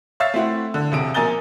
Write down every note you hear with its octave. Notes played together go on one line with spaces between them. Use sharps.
C#5 E5 F5 E6 A6 C7
A3 C4 E4 F#5
D3
E1 C3 D7
A#1 A#3 G#5 A#5 A6 G7